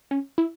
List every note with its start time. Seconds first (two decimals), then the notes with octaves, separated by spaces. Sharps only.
0.11 C#4
0.38 E4